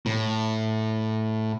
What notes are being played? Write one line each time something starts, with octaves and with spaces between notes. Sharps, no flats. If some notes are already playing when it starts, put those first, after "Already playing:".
A2